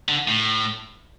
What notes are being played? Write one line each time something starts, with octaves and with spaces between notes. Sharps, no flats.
D3
A2